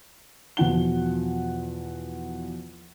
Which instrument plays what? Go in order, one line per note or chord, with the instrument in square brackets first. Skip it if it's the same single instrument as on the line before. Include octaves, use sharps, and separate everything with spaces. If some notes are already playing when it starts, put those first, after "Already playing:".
[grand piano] E2 B2 F3 F#5 G7